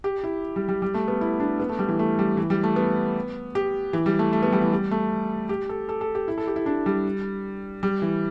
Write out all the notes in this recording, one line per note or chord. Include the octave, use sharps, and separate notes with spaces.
G4
E4
G3
G3
G3
A3
B3
E4
D4
B3
A3
G3
E3
A3
G3
E3
G3
A3
B3
G4
E3
G3
A3
A3
B3
G3
E3
G3
A3
G4
A4
A4
A4
G4
E4
A4
G4
E4
D4
G3
G3
E3